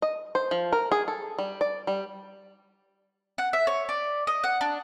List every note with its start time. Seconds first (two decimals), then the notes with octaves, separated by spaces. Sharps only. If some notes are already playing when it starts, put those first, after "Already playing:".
0.02 D#5
0.35 C5
0.51 F3
0.72 A#4
0.92 G#4
1.08 A4
1.38 G3
1.61 D5
1.87 G3
3.38 F#5
3.53 E5
3.67 C#5
3.89 D5
4.27 D#5
4.44 F#5
4.61 D4